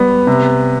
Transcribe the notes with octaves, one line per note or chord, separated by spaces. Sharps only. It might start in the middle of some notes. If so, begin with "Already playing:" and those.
Already playing: G3 B3
C3